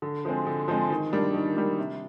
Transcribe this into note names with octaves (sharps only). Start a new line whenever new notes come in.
D3
F3 G#3 C4
D3
F3 G#3 C4
D#3
G3 A#3 D4
D#3
G3 A#3 D4
C3